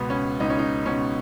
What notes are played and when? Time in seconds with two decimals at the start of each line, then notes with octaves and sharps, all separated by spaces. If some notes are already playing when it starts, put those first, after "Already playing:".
Already playing: C#2 B2 B3
0.10 C#4
0.40 C#2 D#4
0.50 C#4
0.59 D#4
0.86 B2 C#4